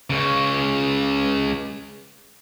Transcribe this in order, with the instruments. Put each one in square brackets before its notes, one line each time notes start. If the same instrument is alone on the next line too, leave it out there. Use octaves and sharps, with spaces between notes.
[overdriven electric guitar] C#2 C#3